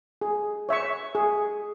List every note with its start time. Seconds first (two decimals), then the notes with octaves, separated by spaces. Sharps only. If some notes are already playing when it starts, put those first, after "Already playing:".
0.21 G#4
0.69 C#5 E5 C#6
1.15 G#4